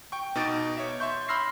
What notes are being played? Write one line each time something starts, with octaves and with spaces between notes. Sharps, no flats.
G5 C#6
B2 D#4 D6 A6 D7
C#5 E5
E5 C6 C#6 G6
B5 C6 E6 F6 A#6 C7